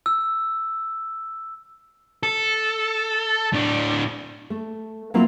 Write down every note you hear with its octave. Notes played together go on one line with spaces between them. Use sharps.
E6
A4
A2 D4
A3
F#3 A#3 C4 E4 F4